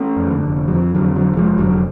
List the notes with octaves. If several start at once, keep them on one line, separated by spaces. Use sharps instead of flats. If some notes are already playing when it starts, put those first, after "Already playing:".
Already playing: A3 C#4
F2
F3
D3
F1
F#3
F2 F3
D3 F#3
F2
D3 F#3
F1
F3 G#3
F1 D3 F#3
D3